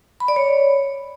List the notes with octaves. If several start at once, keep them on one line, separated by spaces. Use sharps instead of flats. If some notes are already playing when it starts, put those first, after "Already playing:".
B5
D5
C#5